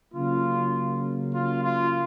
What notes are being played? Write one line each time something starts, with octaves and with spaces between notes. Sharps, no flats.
C#3 F#3 A#3 F4
F4
F4